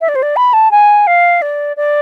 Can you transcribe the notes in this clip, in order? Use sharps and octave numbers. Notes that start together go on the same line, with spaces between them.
E5
D5
C5
D5
B5
A5
G#5
F5
D5
D5